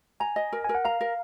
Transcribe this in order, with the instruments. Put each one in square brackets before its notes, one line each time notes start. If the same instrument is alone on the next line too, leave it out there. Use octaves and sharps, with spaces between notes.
[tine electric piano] G#5 [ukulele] A#5
[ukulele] D#5
A#4
[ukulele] A#4 [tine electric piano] G#5
[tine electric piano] F#5
[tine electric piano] F5 [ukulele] A#5
[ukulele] A#4